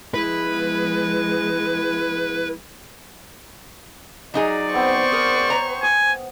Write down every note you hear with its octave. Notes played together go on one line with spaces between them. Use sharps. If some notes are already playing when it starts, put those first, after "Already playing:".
F3 G#3 B3 E4 B4
F#3 D#4 G#4 D5
B3 C4 C5 C#6
G#4 A#4
C#5 A#5
G#5 D#6